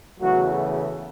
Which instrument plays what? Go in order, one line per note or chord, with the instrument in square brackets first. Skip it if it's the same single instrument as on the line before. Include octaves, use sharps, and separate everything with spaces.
[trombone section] E2 C#3 E3 F#3 A3 F#4